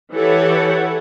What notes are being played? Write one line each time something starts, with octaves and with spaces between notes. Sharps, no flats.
E3 G4 A4 C#5 F#5